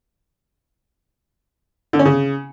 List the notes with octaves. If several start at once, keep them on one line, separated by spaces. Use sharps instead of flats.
D3
C#4
C#3